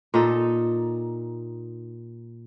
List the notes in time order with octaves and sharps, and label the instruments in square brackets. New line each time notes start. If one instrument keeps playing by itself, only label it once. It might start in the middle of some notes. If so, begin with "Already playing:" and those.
[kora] A#2 D#4 A4